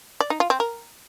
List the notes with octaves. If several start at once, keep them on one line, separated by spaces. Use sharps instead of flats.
D5
D#4
F4
C4
A#4